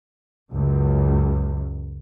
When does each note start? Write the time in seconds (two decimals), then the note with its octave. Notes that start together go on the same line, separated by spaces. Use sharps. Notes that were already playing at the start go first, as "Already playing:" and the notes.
0.51 C#2 F#2